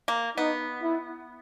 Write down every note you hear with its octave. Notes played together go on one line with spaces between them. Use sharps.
A#3
B3 D#4
E4